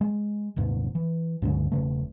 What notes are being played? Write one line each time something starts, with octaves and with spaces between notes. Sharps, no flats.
G#3
D#1 D#2 G#2 C3
E3
C#2 G2 D3 G#3
E1 F2 C#3 A3